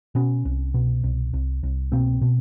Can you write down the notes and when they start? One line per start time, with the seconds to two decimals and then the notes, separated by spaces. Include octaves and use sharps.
0.15 B2 B3 C#4
0.45 C2
0.74 B2
1.04 C2
1.33 C2
1.63 C2
1.92 B2 A#3 C4
2.21 B2